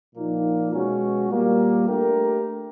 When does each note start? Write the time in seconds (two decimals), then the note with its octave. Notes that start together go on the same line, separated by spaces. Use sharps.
0.15 A#2 F3 A#3 D#4
0.72 B2 G#3 C#4 F#4
1.29 A#2 G3 A#3
1.87 A3 D4 G4 A#4